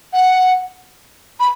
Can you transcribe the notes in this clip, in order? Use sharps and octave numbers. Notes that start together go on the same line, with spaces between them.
F#5
B5